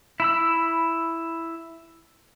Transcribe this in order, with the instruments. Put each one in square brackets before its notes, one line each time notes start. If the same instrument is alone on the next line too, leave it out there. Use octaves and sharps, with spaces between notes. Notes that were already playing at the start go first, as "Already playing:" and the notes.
[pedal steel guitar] E4 B5 E6